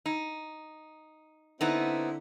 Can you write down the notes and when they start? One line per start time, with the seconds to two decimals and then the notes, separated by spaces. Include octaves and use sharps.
0.06 D#4
1.61 D3 B3 C4 D#4 E4